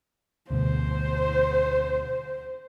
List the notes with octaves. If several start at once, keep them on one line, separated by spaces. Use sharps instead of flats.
D2 B2 C5